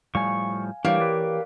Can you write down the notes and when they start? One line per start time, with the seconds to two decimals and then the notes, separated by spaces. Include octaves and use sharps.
0.15 A2 F3 G3 F5 G#5 C#6
0.85 E3 G3 A3 A#3 D4 G4 C#5
1.00 B4 D5